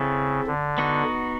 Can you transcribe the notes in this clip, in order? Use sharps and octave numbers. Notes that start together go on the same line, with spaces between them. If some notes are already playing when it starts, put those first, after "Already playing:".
Already playing: C#3 C4 E4 A4
D3
B3 D#4 F#4